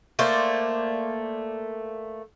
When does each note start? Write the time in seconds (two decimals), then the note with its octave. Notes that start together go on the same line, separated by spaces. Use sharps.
0.19 A3 A#3 C5 D5